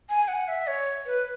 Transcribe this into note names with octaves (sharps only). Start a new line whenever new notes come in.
G#5
F#5
E5
C#5
B4